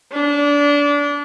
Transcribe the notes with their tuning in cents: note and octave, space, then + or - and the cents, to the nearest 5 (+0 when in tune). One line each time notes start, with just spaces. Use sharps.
D4 -25